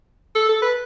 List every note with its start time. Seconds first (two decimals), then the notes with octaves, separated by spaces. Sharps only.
0.35 A4
0.49 A4
0.62 B4